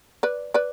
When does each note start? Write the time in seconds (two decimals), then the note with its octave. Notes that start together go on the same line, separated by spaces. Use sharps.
0.23 B4 D5
0.54 B4 D5